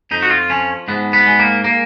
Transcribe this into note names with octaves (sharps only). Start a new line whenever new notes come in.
F2 D#4
F#4
F4
F3 C#4
G#2 B3
B3
G#3
A#3
A#3